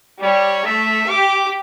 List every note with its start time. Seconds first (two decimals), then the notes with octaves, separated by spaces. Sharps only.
0.22 G3 C#5
0.66 A3 E5
1.09 G4 D6